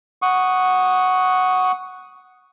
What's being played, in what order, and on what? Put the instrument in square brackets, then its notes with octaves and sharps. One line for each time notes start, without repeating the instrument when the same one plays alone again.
[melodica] F#5 C#6 D#6